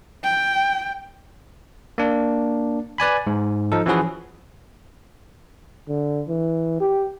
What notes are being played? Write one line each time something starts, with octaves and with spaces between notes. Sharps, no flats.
G5
A#3 D4
B4 D5 G#5 B5
G#2
F3 D#4 A4
E3 F3 C#4 F#4 G#4 B4
D3
E3
G4